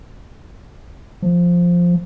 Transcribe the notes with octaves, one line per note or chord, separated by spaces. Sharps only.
F3